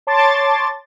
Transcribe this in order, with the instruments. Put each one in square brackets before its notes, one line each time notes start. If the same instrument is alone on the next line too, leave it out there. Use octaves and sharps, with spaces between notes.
[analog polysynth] C#5 A5 C6 D6 A6